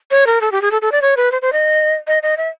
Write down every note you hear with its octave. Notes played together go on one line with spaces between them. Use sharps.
C#5
A#4
A4
G4
G#4
A4
A4
D5
C#5
B4
C5
C5
D#5
D#5
D#5
E5